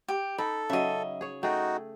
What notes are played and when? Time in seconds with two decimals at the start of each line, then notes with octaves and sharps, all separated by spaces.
0.08 G4
0.38 D#4 A4 B5
0.70 C#3 F#3 D#5 E5
1.21 G#4 C#5
1.43 A3 D#4 F#4 G#4 G5